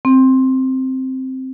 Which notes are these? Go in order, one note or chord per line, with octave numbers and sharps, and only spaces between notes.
C4